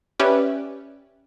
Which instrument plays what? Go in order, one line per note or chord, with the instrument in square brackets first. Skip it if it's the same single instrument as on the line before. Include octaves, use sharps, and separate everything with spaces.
[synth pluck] C#4 G4 B4 D5 E5